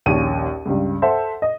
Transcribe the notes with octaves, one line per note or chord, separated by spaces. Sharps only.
A#1 D#2 C#4 D#7
C#2 G2
A4 C5 E5 F#5
D#5